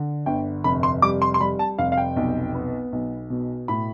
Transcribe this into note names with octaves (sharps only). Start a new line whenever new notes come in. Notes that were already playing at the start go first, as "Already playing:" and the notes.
Already playing: D3
G1 G5
F1 B5
C6
G3 D6
C6
C6
G3 B5
A5
F1 F5
F5
G5
B1
B3
B1
B2
A2 B5